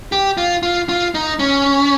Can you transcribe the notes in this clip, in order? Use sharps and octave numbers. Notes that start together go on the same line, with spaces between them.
G4
F4
F4
F4
D#4
C#4